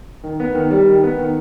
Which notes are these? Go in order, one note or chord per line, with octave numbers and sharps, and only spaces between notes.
D#3
B3
D#3
G3
D#3
B3
D#3